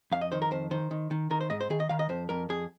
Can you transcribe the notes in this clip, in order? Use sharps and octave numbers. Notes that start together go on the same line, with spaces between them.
F2 F5
D#5
D#3 C5
A#4
F2 C5
D#3 C5
D#3
D#3
D#3 A#4
C5
G#2 D#5
C5
D#3 G#4
D#5
D#3 F5
D#5
F2 C5
F2 A#4
F2 G#4